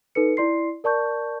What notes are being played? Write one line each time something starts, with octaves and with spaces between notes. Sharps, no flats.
D#4 A4 B4 C#7
E4 D5 C6 C7
A#4 D5 A5 C#6 G6